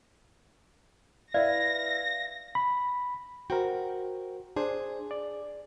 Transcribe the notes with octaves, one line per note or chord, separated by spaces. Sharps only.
E4 B4 D5 E5 F5 A#6
B5
F#4 A#4 C5 G5
D4 G#4 C5
D5